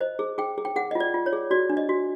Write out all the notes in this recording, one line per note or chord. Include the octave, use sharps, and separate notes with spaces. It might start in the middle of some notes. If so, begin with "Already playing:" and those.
C5 D#5
G#4
G#4 G5
G#4
G5
G#4 F#5
F4 D#5
D5
F4
C#5
G#4
F#4 D5
D4
D#5
F#4